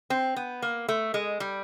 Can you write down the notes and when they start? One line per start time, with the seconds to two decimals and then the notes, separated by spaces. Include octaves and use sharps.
0.10 C4
0.36 B3
0.62 A#3
0.89 A3
1.14 G#3
1.40 G3